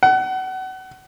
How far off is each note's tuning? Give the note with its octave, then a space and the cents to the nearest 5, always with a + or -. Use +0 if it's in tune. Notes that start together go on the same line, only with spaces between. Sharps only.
F#5 +30